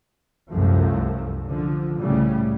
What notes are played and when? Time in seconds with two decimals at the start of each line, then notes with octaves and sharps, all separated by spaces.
0.50 C2 F#2 F3 A3
1.47 D3 F3
2.00 C2 A2 C#3 G3 A3